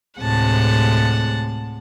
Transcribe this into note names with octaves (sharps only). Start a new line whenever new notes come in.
D2 A2 C3 G#3 F#5 A5